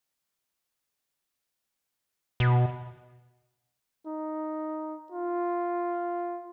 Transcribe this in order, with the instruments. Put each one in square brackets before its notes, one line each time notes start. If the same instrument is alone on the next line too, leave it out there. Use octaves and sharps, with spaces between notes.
[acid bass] B2
[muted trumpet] D#4
F4